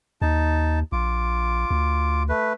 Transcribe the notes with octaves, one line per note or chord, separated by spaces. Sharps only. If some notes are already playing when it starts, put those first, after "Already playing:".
D#2 D#4 A5
A#1 F4 D6
D2
A3 B4